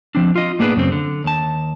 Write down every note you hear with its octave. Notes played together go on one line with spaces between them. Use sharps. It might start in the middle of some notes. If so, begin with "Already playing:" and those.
F3 C4 D4
F4 D#5
A2 A#3 B3 D4 G#4 B4
F#2 C#3 C4
D3
D#2 A5